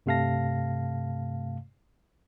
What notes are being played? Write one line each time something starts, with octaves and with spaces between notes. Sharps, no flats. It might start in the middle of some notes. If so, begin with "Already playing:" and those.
G2 C3 A3 F5 A5 A#6